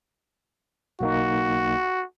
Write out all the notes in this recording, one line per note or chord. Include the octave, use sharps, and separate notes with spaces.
B1 A#3 D#4 F#4